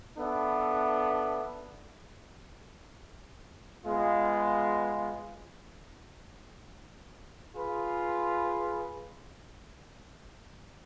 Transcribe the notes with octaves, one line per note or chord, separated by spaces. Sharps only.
B3 D4 A4 E5
G#3 B3 F4
F4 G#4 B4